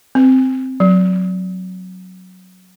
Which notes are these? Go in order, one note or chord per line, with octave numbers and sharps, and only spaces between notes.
C4
F#3